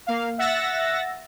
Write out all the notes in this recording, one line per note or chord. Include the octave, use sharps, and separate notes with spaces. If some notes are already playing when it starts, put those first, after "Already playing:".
A#3 F5
E5 F#5 E6 A6 A#6